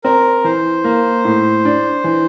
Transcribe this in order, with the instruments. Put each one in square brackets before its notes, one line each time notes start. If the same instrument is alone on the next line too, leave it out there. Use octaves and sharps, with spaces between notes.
[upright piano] C4 [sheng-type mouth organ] A#4
[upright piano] E3 [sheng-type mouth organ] C5
[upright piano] A#3
A2
D4
E3